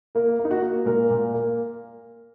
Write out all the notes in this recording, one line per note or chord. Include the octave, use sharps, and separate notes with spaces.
A#3 A#4
A#3
D#4
F#4
A#3
A#2 A#4
A#2
A#3